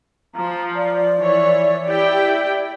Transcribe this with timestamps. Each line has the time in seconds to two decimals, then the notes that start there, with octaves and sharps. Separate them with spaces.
0.35 F3 A#5
0.76 D5
1.18 E3 C#5
1.86 E4 G4 G5